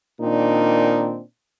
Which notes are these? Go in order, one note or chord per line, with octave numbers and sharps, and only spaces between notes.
A#2 D#3 C4 D4 D#4